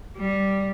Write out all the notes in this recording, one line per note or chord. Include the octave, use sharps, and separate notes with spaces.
G3